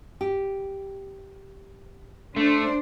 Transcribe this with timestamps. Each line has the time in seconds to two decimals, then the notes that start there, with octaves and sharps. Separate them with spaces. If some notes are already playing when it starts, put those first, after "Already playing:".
0.21 G4
2.36 A3 D4 C5 D5